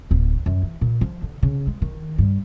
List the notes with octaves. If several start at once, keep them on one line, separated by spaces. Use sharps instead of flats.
D1
F#2
E3
A#2
F3
D3
C#3
G#3
D#3
G2